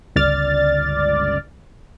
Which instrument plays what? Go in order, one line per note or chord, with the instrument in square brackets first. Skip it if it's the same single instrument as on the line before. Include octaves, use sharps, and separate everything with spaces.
[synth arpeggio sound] G1 C#2 D5 F6 A6